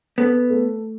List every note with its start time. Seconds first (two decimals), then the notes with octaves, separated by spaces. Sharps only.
0.18 B3 A4
0.50 A3